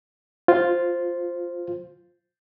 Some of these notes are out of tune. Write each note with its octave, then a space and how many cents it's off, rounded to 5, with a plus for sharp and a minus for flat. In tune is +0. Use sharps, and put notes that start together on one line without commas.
F4 +0 C5 +0